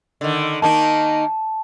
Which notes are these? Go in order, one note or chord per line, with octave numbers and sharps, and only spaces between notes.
D3 D#3
D#3 A#3 D#4 A5